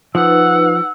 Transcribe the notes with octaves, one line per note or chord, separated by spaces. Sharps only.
F3 D#4 B4 F#5 E6